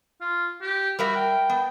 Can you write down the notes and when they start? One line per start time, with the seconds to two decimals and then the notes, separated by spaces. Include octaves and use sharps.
0.21 F4
0.62 G4
0.99 G3 F#4 A#4 E5
1.16 G5
1.50 B3